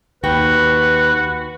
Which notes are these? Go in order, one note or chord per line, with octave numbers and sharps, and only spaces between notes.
D#2 F#4 B4 G5